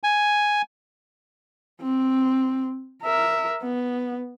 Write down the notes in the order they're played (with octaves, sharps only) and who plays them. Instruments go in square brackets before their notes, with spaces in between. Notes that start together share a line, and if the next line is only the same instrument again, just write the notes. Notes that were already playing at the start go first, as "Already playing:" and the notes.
[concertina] G#5
[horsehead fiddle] C4
A#4 E5
B3